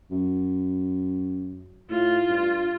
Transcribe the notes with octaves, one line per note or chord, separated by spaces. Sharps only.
F#2
A2 F4
G2